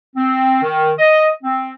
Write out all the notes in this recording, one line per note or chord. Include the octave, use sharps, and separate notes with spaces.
C4
D#3
D#5
C4